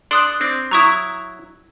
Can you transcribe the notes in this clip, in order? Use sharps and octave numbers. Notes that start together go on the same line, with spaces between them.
D4 A4 D5 C6 D#6 F#6
C4 D4
F#3 E4 A#5 C#6 D#6